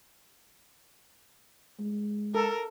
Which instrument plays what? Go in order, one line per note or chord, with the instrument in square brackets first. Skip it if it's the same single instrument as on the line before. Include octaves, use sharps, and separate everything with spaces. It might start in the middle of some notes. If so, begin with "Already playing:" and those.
[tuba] G#3
[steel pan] A4 [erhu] A#4